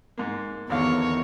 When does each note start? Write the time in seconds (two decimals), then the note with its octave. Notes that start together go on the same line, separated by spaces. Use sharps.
0.18 G#2 A#3
0.69 G#1 E2 D3 D#3 C#5 F5